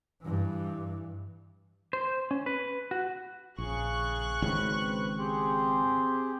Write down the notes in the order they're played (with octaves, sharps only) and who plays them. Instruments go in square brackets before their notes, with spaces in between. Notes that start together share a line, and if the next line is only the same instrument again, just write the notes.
[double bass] G2 E3
[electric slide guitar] C5
C#4
B4
F#4
[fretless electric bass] A#1 [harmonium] C#3 G#4 [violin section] C#6 F#6
[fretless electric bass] G#1 C#3 C#4 [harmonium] C4 B4
[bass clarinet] C4 [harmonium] G4 G#4